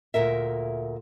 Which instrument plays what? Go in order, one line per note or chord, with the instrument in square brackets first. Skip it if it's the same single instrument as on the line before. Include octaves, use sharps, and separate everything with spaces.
[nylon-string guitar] D2 A#2 A#4 E5